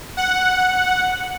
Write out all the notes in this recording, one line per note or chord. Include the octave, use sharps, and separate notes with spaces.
F#5